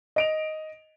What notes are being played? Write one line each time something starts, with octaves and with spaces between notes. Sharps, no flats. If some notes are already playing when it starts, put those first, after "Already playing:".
D#5 D7 F7